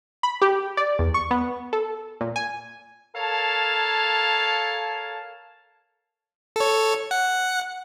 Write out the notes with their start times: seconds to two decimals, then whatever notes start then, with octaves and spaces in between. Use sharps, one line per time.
0.23 B5
0.42 G4
0.77 D5
0.99 E2
1.14 C#6
1.31 B3
1.73 A4
2.21 A#2
2.36 G#5
3.15 A4 A#4 C#5 F5 G#5 A5
6.56 A4 C#5
7.11 F#5